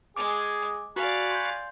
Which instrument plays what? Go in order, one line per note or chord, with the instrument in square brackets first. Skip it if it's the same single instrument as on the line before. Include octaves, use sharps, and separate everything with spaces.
[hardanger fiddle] G#3 [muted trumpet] G#4 [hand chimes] D6
[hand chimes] F#4 [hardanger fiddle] D5 F5 [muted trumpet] G#5 [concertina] B5 C#6 F#6
[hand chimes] C6 G6